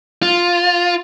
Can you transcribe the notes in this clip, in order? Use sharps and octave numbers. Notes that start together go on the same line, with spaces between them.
F4